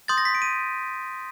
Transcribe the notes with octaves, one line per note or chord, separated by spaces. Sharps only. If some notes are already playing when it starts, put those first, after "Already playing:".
C6 D#6 G6 A6
A#6
B6
D7
D#7